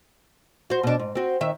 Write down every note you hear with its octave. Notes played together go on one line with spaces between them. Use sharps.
F#4 C5
B2 D4
G#2
C4 F#4
D#3 E5